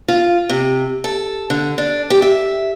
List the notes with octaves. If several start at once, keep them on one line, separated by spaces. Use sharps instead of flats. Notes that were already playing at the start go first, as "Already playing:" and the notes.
F4
C3
A4
D3
D4
G4
E5